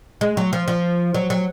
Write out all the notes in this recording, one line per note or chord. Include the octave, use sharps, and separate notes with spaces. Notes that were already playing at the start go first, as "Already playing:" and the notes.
G#3
F#3
F3
F3
F#3
F#3